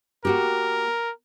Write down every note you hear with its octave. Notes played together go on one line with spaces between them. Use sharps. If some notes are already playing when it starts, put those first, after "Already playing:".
A#3 F#4 G4 A#4